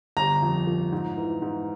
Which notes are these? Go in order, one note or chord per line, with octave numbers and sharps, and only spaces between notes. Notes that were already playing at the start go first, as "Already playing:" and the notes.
G1 A#5
F2
F3
G#2
E3
G#2